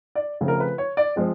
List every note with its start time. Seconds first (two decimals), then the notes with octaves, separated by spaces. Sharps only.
0.15 D5
0.41 C#3 F3 A3 C4
0.48 A#4
0.60 B4
0.78 C#5
0.97 D5
1.16 F3 G#3 C4